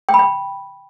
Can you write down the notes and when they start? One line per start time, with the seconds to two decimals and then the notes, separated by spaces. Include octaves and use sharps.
0.09 G5
0.14 B5
0.19 G5